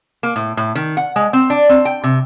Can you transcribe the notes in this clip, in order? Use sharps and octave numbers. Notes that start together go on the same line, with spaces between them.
A#3
A2
A2
D#3
F#5
G#3
C4
D4
C4
G5
C3